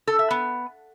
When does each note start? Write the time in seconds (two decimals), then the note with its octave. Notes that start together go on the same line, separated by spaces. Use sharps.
0.07 A4
0.19 E5
0.31 B3